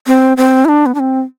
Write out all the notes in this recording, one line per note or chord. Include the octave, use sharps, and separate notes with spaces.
C4
C4
E4
D4
B3
D4
C4